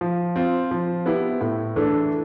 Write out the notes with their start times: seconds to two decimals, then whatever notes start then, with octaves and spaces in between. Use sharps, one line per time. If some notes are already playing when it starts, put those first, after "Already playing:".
0.01 F3
0.36 C4 F4
0.71 F3
1.06 B3 E4 G4
1.41 A2
1.76 E3 A3 D4 A4